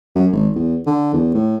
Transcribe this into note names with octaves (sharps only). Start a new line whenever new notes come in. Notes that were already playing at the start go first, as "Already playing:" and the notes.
F#2
G#1
E2
D3
E2
A2